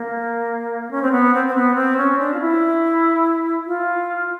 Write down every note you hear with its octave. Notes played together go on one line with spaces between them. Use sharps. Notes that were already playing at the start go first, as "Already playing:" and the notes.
Already playing: A#3
C#4
C4
B3
C4
C4
B3
C4
C#4
D4
F4
E4
F4